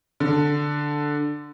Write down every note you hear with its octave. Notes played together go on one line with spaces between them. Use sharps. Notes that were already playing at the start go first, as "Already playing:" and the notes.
D3